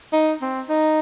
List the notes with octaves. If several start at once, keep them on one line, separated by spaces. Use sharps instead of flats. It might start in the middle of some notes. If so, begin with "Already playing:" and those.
D#4
C4
D#4